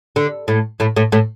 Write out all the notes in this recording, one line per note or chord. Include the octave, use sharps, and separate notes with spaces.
D3
A2 A3
A2 A3
A2 A3
A2 A3